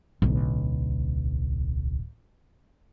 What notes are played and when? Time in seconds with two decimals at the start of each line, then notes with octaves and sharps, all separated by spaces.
0.22 D1 B1